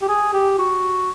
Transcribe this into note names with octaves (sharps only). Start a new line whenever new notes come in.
G4
G#4
G4
F#4